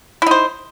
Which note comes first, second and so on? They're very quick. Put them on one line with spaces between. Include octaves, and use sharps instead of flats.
E4 D#4 C5